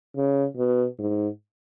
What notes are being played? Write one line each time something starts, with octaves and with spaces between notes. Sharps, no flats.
C#3
B2
G#2